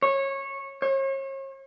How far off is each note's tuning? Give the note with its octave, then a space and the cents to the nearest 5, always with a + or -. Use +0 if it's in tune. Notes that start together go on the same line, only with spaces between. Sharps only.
C#5 -20
C#5 -40